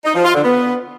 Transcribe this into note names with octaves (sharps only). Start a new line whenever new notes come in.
D#4
F3
F4
D3
B3